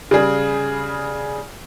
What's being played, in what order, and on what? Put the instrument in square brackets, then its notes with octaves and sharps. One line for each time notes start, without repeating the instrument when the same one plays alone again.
[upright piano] C#3 G3 G#4